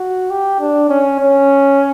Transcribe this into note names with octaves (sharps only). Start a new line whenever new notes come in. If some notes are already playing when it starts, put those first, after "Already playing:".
Already playing: F#4
G4
D4
C#4
C#4